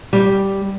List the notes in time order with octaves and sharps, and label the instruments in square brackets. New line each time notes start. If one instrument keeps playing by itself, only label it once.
[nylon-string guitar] G3